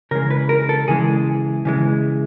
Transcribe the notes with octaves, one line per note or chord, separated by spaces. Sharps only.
C#3 E3 G#3 A#4
B4
A#4
A4
C#3 E3 G#3 G#4
C#3 E3 G#3